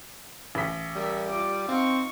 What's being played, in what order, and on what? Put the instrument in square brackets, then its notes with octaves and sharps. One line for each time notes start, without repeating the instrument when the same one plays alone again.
[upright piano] A1 B6
[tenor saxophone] G3 [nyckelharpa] A#4 E5
[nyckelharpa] F4 D6
[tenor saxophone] C4 [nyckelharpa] D#4 C#6 [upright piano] F5